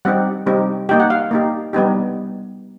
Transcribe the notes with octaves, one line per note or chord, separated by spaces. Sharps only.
G3 C4 D#4 G4 F#5
G3 C4 D#4 G4
A#3 D#4 G4 G5
F#5
F5
A#3 D#4 G4
G3 B3 D#4 G4